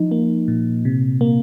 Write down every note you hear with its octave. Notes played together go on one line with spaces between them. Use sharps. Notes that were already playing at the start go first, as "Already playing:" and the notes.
Already playing: F3 D#4
A#3
A#2
C3
A#3